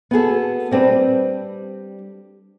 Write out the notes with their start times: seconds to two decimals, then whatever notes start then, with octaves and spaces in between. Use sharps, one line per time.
0.11 B3 F#4 G#4 A4
0.71 G3 C4 D4 B4